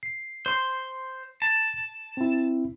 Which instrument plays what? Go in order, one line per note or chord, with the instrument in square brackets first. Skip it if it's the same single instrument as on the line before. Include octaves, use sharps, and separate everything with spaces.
[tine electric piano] C7
[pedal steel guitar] C5 C6
A5
[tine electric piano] C4 E4